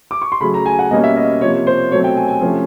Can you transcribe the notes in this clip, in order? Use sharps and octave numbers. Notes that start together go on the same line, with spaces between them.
D6
C#6
C6
C#3 F#3 A3 B5
A#5
G#5
F#5
B2 G3 A#3 C#4 D#5
E5
D#5
C3 F3 A#3 C#5
C5
B2 F#3 A3 C4 C#5
G5
G#5
G#5
C3 F3 A3 C#4